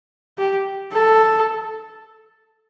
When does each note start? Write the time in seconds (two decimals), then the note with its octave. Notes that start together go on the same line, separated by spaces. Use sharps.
0.38 G4
0.93 A4